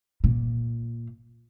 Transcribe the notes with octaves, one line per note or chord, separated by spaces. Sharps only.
A#2